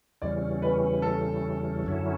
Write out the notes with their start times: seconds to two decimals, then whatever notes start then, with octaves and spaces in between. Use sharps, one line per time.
0.22 E2 C#3 E3 G3 C#4 D5
0.62 B4
1.02 A4
1.84 F#2 D3 F#3 C#4 E4